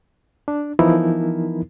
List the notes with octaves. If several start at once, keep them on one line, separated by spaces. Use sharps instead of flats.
D4
E3 F3 B3 D#4 E4 A#4